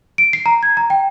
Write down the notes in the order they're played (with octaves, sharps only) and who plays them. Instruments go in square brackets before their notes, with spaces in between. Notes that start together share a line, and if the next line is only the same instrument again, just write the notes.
[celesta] D7
C7
A#5
G#6
A#5
G5